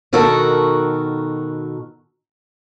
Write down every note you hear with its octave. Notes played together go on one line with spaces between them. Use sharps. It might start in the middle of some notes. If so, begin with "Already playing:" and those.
B2 D#3 F#4 A4 A#4